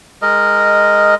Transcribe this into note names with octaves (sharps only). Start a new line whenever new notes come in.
G#3 A#4 D#5